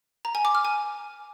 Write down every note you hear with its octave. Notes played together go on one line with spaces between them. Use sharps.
A#5
G#5
D6
F6
G#5